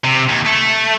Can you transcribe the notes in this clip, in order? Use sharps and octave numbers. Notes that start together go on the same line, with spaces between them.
C3
D#2
A3